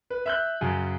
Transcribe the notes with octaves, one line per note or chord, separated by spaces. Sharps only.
B4
E5 F#6 G6
F#2 C#3